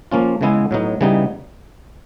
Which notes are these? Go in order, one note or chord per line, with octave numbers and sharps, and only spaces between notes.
F3 A#3 C#4 F4
C#3 E3 G#3 B3 E4
A2 F#3 B3 D#4
C#3 E3 G3 B3 D#4